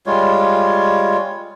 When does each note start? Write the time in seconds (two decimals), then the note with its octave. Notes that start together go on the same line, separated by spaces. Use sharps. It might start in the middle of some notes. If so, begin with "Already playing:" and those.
0.06 G3 G#3 F4 C#5